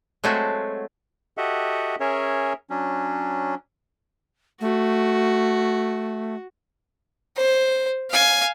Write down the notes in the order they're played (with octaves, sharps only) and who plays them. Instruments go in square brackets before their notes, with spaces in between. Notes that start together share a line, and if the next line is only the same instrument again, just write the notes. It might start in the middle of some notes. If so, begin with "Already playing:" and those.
[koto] F#3 G#3 A3 C4 F#4
[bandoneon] F#4 G4 A4 D#5 E5 F#5
C#4 G#4 A#4 C#5 E5
F#3 C#4 D4
[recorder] A3 [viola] F#4
[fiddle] C5
F5 G#5